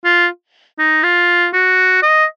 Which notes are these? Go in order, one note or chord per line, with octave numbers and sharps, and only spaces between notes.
F4
D#4
F4
F#4
D#5